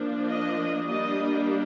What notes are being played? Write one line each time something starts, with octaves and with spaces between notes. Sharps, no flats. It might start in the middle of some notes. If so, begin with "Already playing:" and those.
Already playing: F3 A#3 D4
D#5
G3 A#3 D4 D#5